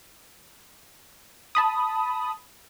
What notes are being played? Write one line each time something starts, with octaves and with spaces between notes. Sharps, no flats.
A5 B5 D#6